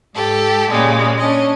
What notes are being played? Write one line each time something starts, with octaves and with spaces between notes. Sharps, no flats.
G#2 G4 A4
A#2 C#3 G3 G#3
C#4 D4 C#5 D#5